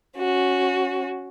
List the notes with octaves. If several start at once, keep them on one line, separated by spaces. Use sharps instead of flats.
C#4 F#4